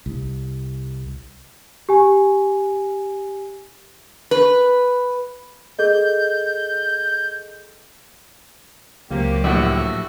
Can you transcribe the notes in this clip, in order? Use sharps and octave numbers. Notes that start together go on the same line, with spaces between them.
C2
G4 G#5
B4
G#4 A4 D#5 G6
C#2 C3 F#3 A#3 G4
A#1 A2 F#4 A4 E5 F#5